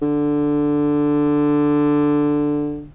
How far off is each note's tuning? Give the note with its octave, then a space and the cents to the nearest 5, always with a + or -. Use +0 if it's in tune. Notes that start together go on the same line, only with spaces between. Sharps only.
D3 +0